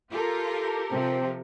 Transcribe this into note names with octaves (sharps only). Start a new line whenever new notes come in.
F4 G4 A4 A#4
C3 F3 C4